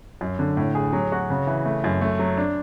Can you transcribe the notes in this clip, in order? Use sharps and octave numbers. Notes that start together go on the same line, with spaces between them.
F#2
D3
A2
G#4
F#3
F#4
C#3
E3
A3
F#2
A3
F#3
D4